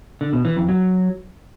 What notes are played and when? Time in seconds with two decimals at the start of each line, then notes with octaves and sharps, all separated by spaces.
0.21 D3
0.33 B2
0.45 E3
0.57 F2
0.69 F#3